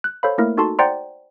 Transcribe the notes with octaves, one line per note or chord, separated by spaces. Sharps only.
F#6
A4 C5 C#5 F5 B5
A3 A#3 E4 A#4
D#4 F#4 A4 A5 C6
C5 D5 F#5 G5 A#5 C6